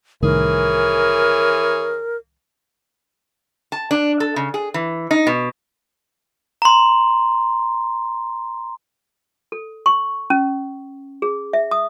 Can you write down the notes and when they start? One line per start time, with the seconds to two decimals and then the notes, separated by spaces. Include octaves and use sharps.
0.22 C2 A2 D#3 E3 G#4 A#4 C#5
3.72 A5
3.91 D4
4.20 A4
4.36 C#3
4.54 G#4
4.74 E3
5.11 D#4
5.27 B2
6.62 A#5 C6
9.52 A4
9.86 C#6
10.30 C#4
11.22 G#4
11.53 E5
11.71 D#6